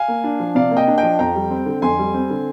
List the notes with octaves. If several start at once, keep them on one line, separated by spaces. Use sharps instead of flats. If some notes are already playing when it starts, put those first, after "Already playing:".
Already playing: F5 G#5
A#3
D4
F3
C3 D5 F5
A#3
D#5 G5
D4
D#5 G5
F3
F2 G5 A#5
G3
C4
D3
F2 G#5 C6
G3
C4
D3